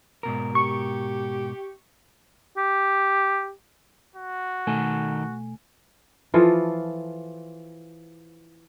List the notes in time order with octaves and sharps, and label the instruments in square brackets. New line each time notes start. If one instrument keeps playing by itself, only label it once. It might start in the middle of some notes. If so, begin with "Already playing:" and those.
[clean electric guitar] G#2 B2 A#4
[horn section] G4 [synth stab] C#6
[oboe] G4
[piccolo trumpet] F#4
[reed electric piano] B2 A3 G#5 [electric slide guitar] D#3 A4
[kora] E3 F3 F4 A4